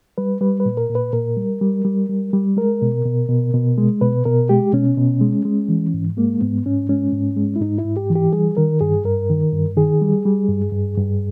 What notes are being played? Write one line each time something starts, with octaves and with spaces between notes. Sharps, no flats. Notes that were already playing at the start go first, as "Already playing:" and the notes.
G3 B4
G3 B4
B4
A#2
A#4
A#2
B4
A#2 A#4
G3
G3
G3
G3
G3
G#3 A#4
B2
B2
B2
B2
G#3
B2 B4
B2 A#4
G#3 G4
B2 C#4
B2
G#3
G#3
E3
G#2
G#3 A#3
G#2 B3
G#2 C#4
G#3 C#4
G#2
G#3
E4
G#2 D#4
E4
G#2
G4
E3
G4
G3 G#4
D#3 A#4
G2 G#4
G2 A#4
D#3
G2
D#3 G#4
G3
G3
G2
G2
G2